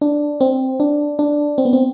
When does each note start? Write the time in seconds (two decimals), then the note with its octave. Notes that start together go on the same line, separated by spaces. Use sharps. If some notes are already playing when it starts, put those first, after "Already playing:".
0.01 D4
0.41 C4
0.80 D4
1.19 D4
1.58 C4
1.65 B3
1.73 C4